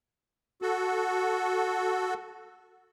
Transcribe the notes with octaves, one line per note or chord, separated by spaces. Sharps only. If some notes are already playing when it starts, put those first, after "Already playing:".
F#4 A4